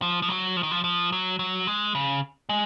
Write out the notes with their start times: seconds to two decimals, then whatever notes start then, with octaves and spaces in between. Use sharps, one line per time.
0.02 F3
0.22 F3
0.29 F#3
0.57 F3
0.63 D#3
0.71 F3
0.84 F3
1.12 F#3
1.39 F#3
1.67 G#3
1.95 C#3
2.49 G#3